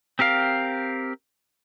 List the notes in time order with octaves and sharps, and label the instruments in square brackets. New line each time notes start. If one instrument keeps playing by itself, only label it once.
[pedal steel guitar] C4 G4 A#4 F5